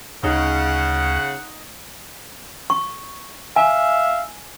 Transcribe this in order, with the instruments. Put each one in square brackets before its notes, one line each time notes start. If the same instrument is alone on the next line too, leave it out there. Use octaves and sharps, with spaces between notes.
[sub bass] D2 [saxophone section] C#3 [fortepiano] D#4 [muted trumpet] F#5
[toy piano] C#6
[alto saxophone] E5 [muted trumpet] F5 [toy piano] G#5